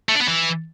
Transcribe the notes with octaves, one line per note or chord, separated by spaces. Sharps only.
A3
D4
B3
E3